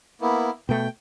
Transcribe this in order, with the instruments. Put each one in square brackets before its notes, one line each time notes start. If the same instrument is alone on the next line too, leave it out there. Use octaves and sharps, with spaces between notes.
[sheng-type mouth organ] A#3 B3 E4
[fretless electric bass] B2 A3 [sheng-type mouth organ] G5